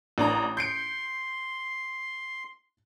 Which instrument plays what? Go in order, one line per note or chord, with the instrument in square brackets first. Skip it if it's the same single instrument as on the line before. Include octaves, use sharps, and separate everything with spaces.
[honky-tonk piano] A1 D4 A#5
[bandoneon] C6 [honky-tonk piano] G6 C#7 D7